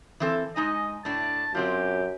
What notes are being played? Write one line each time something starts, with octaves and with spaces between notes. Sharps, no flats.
E3 C4 A4
G#3 D#4 D#5 G#5
A2 D4 A5
F#2 F#3 C4 F4 G4